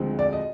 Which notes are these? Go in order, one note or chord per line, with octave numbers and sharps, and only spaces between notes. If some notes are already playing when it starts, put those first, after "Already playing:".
Already playing: D2 D3 F3 G#3 C4
D5
D#5